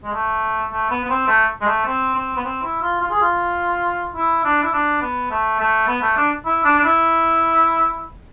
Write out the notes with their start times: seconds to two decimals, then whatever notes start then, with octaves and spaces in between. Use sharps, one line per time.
0.04 G#3
0.12 A3
0.70 A3
0.90 B3
1.04 B3
1.09 C4
1.28 A3
1.61 G#3
1.67 A3
1.86 C4
2.15 C4
2.37 B3
2.44 C4
2.63 E4
2.82 F4
3.01 F4
3.11 G#4
3.21 F4
4.16 E4
4.45 D4
4.63 E4
4.73 D4
5.01 B3
5.31 A3
5.60 A3
5.88 B3
6.02 A3
6.16 D4
6.46 E4
6.64 D4
6.79 D4
6.84 E4